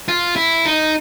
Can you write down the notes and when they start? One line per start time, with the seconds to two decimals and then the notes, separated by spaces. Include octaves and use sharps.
0.08 F4
0.36 E4
0.65 D#4